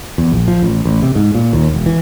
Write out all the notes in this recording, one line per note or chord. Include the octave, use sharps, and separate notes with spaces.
E2
A#1
F3
A1
A1
C3
G#2
A#2
D#2
E1
E3